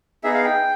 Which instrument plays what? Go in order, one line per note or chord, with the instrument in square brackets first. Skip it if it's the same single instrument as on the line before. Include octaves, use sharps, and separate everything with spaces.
[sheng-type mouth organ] B3 D#4 G#4 E5
F5
G5